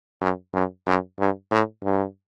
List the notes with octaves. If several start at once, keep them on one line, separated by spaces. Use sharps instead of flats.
F#2
F#2
F#2
G2
A2
G2